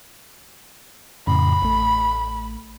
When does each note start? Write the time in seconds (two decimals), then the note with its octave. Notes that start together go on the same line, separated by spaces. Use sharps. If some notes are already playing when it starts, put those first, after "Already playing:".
1.27 F2 A2 C#3 B5
1.62 A1 A3